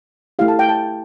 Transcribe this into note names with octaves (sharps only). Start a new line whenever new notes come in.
A3 E4 G4 F5
A5
G5
A5